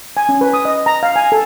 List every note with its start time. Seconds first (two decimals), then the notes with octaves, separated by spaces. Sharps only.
0.17 G#5
0.29 C#4
0.41 B4
0.54 D#6
0.65 D#5
0.86 A#5
1.03 F5
1.16 G#5
1.32 A4